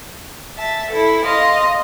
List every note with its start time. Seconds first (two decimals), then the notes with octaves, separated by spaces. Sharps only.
0.58 E5 A5
0.91 E4 A4
1.24 D#5 F5 C6